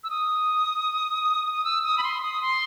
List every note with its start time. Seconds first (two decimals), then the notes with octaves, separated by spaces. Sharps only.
0.04 E6
0.10 D#6
1.53 D#6
1.65 E6
1.84 D#6
1.98 B5
2.03 C6
2.22 D#6
2.42 C6